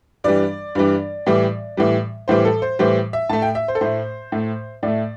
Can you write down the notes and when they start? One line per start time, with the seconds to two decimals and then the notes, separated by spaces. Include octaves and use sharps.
0.24 G2 E3 G3 D5
0.75 G2 E3 G3
1.26 A2 E3 G3
1.77 A2 E3 G3
2.28 A2 E3 G3 C5
2.45 A4
2.62 C5
2.79 A2 E3 G3 C5
3.13 E5
3.29 A2 A3 A5
3.42 G5
3.55 E5
3.68 C5
3.75 A4
3.81 A2 A3 C5
4.32 A2 A3
4.83 A2 A3 D5